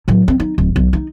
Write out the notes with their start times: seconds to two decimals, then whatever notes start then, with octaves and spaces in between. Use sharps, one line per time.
0.08 A2 F#3
0.28 C4
0.40 D#4
0.58 D1
0.76 B1
0.93 D#4